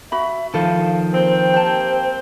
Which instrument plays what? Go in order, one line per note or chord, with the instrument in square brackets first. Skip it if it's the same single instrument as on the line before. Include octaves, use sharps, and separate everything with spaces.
[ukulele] F#4 B5 [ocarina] E5
[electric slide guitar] D#3 F3 [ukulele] A4 [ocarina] F5
[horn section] A#3 C4 G5 [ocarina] C5
[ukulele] G4 A5